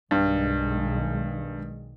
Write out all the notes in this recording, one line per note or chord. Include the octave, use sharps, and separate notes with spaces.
B1 G2 D#3 G#3